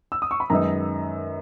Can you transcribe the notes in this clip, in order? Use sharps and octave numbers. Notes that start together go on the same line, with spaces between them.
E6
D#6
C#6
B5
F#2 D#3 G#3 B3 D#4 A#5